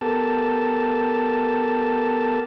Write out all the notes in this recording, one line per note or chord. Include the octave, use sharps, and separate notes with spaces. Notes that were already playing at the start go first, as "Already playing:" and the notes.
B3 G4 A4 A#4 A5